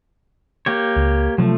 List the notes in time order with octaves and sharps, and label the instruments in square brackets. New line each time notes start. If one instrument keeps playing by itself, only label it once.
[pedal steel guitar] A#3 G4 C#5
[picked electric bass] C#2
[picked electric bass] C3 F#3 [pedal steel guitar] F3 A3